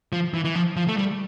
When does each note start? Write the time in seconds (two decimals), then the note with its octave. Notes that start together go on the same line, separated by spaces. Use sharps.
0.13 F3
0.34 E3
0.44 E3
0.55 F3
0.77 F3
0.88 A3
0.97 G3